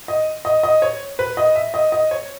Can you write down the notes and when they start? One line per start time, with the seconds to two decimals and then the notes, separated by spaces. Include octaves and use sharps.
0.08 D#5
0.45 D#5
0.63 D#5
0.82 C#5
1.19 B4
1.37 D#5
1.55 E5
1.74 D#5
1.92 D#5
2.11 C#5